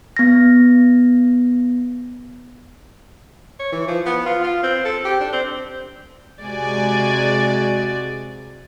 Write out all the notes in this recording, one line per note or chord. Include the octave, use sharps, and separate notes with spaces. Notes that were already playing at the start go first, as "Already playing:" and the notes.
B3 A#6
C#5
E3
F3
B3
F4
F4
C4
A4
G4
D4
C4
C3 G#3 F#4 D5 G#5